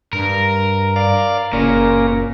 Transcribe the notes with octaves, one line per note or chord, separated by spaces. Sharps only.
G2 A#4
D5 F5
F#1 A#2 A#3 C#4 A#4